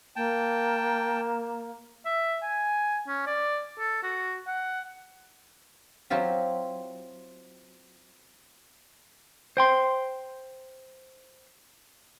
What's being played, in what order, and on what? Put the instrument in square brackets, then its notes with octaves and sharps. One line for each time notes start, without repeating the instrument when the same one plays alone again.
[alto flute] A#3 [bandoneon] G5 A5
[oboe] E5
G#5
C#4
D5
A4
F#4
F#5
[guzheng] F#3 C4 E4 F4 G4
[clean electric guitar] C5 G5 C6